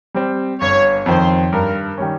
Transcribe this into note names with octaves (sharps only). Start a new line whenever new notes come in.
G3 C4
G1 C#5
F2 D#3 C5
G2 A#4
D#3 G3 C#4